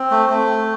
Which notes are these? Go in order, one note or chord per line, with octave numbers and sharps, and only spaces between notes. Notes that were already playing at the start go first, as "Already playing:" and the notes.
Already playing: C4
A3
A3